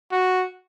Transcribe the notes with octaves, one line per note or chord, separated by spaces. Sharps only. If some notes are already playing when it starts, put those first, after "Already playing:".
F#4